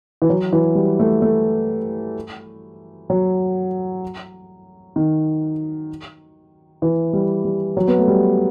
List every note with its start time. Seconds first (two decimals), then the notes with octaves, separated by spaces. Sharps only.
0.22 E3
0.29 F#3
0.53 E3
0.75 G3
0.99 A3
1.22 A3
3.10 F#3
4.96 D#3
6.82 E3
7.13 G3
7.45 G3
7.77 F#3
7.88 B3
7.98 A3
8.08 G3